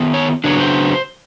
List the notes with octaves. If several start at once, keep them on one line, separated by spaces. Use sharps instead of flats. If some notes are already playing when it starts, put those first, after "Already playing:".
Already playing: D#3 B3
C#5
C#3 F#3 B3 D4 C#5
C5